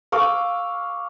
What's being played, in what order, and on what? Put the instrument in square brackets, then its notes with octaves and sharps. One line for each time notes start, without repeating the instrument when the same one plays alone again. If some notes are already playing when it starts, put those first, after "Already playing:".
[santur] F5 C#6 D6 E6